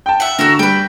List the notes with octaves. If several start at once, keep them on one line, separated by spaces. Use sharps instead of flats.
G5 A5
E5 F#5
D3 F#4 A4 A#4
G3 B4 G5